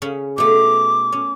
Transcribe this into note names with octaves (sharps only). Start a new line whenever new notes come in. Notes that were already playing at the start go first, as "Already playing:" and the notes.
C#3 C#4 B5
B2 A3 D6
C#4